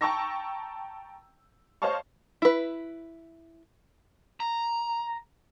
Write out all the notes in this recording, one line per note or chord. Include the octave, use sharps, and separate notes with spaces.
G5 A5 A#5 C#6 E6 A#6
C5 C#5 D#5 F5 A5 C#6
E4 B4
A#5